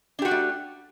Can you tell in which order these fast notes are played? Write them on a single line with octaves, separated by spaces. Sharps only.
D4 G4 F#4 D5 A3